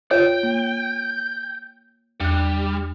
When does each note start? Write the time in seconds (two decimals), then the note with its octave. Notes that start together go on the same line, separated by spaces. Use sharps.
0.11 F4 C#5 G5
0.43 A#3
2.20 E2 G3 F#6